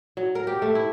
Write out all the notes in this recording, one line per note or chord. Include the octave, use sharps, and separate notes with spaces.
F#3
A#4
G4
A3
E4